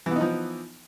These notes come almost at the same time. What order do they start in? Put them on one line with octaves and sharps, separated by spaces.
E3 B3 D#4 F3